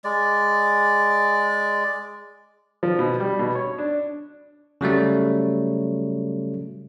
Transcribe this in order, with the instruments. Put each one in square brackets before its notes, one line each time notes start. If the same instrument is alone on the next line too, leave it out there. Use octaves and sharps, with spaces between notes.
[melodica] G#3 D5
[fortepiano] F3
B2
G3
B2
C#5
D4
[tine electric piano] C#3 F#3 G3 A3